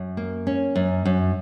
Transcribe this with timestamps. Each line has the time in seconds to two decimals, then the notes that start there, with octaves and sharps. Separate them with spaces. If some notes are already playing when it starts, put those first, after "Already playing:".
Already playing: F#2
0.17 A#3
0.47 C#4
0.76 F#2
1.05 F#2